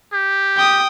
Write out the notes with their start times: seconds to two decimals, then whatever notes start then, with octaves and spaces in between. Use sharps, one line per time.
0.13 G4
0.57 G5 D#6